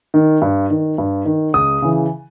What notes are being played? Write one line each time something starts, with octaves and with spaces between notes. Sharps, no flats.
D#3
G2
D#3
G2
D#3
C#2 D#6
C#3 E3